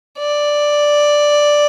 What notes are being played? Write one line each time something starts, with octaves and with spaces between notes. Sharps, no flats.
D5